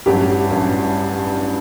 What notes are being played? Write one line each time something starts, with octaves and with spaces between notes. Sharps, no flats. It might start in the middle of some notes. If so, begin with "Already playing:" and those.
A1 G2 F#3 G4
A1 G2 F#3